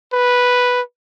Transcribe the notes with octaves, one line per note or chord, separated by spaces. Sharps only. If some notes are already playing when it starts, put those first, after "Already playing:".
B4